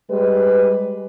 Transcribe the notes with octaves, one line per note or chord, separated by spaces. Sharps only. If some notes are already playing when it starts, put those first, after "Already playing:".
G3 G#3 B4